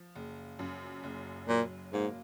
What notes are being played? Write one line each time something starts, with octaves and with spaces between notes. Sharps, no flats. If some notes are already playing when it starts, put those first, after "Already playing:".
Already playing: F3
F#1
F#2
F#1
A#2 F#3
G#2 A#3